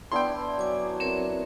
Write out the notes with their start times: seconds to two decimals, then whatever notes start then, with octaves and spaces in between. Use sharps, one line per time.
0.12 B3 D4 E4 G5 C6
0.59 F#3 G#5 D6
1.00 C4 A#4 C#5